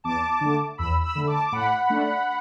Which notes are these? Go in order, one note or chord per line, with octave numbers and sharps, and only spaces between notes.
E2 A5 D6
D3 A3
E2 B5 E6
B5 E6
D3 A3
A5 D6
D6
A2 F#5 B5
A3 D4